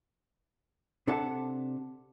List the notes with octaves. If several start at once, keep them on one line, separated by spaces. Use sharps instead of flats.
C3 D4 A4 E5 F#5 A5